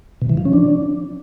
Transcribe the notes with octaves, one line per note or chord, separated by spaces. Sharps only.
B2
E3
F3
C#4
D4